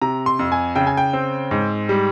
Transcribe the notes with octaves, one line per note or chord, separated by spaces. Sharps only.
C3 A#5
C6
F2
G#5
C#3 G5
G#5
G5
C4
G#2
G3